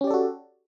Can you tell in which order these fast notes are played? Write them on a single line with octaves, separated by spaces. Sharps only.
C#4 G4 D5 A4 F#4